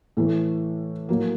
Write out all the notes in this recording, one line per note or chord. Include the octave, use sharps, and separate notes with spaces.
A2 E3 A3
A2 F#3 A#3